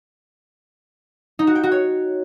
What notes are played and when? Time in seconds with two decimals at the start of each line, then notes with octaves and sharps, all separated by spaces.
1.39 D#4
1.47 F#4
1.55 G5
1.63 F#4
1.72 C#5